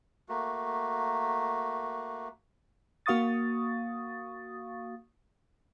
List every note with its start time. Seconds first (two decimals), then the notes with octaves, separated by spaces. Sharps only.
0.29 A3 A#3 F#4
3.06 A#3 F#4 F5 C#6 D#6 A6